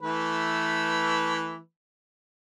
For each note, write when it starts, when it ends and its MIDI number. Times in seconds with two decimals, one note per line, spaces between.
0.02 1.58 52
0.02 1.58 57
0.02 1.58 71